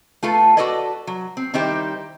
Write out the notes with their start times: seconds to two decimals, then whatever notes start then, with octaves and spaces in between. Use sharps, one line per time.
0.23 A3 F4 A4 B4
0.57 F#4 G#4 A4 B4 D5 D#5
1.07 F#3
1.37 C4
1.54 D#3 G3 D#4 E4 G4 C5